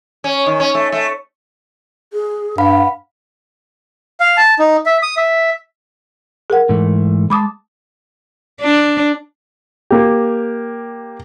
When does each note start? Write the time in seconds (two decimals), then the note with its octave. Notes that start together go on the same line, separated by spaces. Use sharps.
0.24 C#4
0.46 D#3
0.60 C#4
0.75 A3
0.92 A3
2.13 G#4
2.58 G2 F5 F#5 B5
4.20 F5
4.37 A5
4.59 D#4
4.86 E5
5.03 D#6
5.17 E5
6.50 G#4 A#4 F#5
6.69 G#2 E3 A3
7.30 G#3 A5 B5 D6 D#6
8.61 D4
9.91 A#3 G4